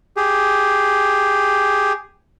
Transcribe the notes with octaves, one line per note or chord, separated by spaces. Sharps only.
G4 G#4